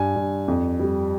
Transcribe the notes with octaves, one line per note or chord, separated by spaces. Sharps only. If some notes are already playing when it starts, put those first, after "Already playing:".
Already playing: G2 G#5
G2
F2
G3